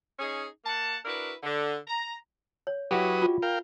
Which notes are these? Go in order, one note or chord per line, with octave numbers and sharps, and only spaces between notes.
C#4 D#4 G#4
A#3 F#5 A5
D4 E4 F#4 A#4 B4
D3
A#5
C#5
F#3 E4 F#4 G4 B4 D#6
F4
A#4 F5 G5